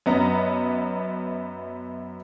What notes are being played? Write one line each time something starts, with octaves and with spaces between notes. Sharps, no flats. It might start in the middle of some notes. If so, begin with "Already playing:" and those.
F#2 B3 D#5 A#5